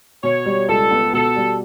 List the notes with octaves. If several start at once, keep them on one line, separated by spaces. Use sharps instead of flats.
B2 C#5
G3
C#2 A4
B3
B2 A4
G3